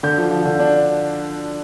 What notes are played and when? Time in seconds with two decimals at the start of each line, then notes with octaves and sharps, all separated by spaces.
0.03 D3 G6
0.18 F3
0.31 F3
0.45 D3
0.59 D4